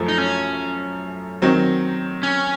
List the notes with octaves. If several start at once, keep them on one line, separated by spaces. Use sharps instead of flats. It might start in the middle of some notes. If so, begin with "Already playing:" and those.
Already playing: F#2 F3 A3
D#4
C#4
D#3 F#3 C4
C#4